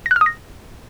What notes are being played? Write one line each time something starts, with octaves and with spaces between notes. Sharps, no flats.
A#6
F#6
F6
D#6
A#6